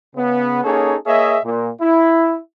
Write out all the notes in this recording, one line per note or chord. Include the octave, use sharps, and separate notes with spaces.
C#3 B3
A#3 C#4 D#4 G#4 A4 C#5
A#3 G#4 C#5 D#5 E5
A#2
E4